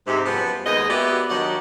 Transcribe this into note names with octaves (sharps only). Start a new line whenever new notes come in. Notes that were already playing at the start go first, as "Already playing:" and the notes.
G#2 C3
F#2 F3 G3 B3
D#2 G#3 B3 D#5
A#3 B3 F#4 G4 D5 E5
G2 D#3 F#3 D5 D#5 F#5